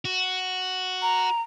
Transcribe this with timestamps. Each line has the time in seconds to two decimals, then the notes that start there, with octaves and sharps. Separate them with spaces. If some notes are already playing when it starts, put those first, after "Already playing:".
0.05 F#4
1.02 A#5